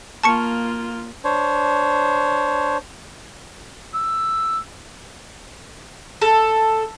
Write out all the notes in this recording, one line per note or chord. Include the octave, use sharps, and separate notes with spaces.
A#3 F4 A5 C#6 C#7
D4 C5 C#5
E6
A4